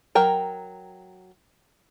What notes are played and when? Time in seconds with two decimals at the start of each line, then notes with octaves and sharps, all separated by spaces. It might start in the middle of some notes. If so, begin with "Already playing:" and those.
0.15 F#3 A#4 G5 A#5